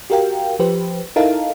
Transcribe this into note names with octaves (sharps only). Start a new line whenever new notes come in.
F#4 G4 A#4 F5 G5
F3 G4 B4 C5
D#4 E4 A4 A#4 F5